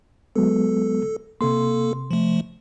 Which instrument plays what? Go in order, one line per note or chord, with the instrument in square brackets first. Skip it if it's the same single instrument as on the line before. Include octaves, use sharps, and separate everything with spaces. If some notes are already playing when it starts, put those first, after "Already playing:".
[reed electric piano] F#3 G#3 B3 [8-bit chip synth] A4
[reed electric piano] C3 C6 [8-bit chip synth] A#3 A4
[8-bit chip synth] F3 A3